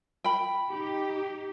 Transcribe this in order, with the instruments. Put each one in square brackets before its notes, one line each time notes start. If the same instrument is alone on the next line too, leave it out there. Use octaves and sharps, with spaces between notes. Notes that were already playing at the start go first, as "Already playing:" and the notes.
[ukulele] G5 B5
[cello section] D#4 G4